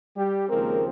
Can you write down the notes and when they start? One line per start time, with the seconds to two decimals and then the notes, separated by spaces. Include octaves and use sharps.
0.16 G3 G4
0.49 D#2 C#3 F3 G#3 A#3 C4 A#4